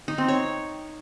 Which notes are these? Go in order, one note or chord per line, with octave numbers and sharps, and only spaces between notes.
D#4
C4
C#5